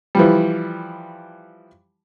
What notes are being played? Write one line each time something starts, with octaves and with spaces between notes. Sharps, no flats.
E3 F3 G3